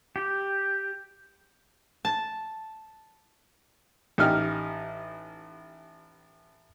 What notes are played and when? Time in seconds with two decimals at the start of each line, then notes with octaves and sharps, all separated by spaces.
0.16 G4
2.05 A5
4.18 A1 D#4 G4 F6